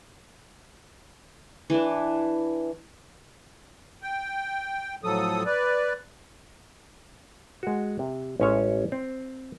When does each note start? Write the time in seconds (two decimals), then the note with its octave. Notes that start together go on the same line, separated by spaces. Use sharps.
1.70 E3 D4
4.02 G5
5.04 A2 F3 F#3 A4 D#6
5.46 B4 D5
7.63 G#3 F#4
7.99 C3
8.40 A1 G#3 C#4 G#4 C#5 E5
8.92 C4